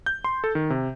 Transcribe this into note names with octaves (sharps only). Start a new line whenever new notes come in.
G6
C6
A4
D#3
C3